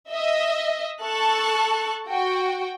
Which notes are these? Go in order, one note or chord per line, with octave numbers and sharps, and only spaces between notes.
D#5 E5
A4 A5 C#6 F#6
F#4 G5